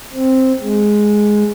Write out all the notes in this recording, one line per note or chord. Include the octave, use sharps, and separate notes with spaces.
C4
G#3